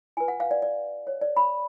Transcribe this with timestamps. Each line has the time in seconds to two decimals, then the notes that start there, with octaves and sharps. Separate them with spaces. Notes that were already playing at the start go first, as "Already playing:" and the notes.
0.17 F4 B4 G#5
0.28 F#5
0.40 F5
0.51 D5
0.62 D5
1.07 C#5
1.21 D5
1.36 B5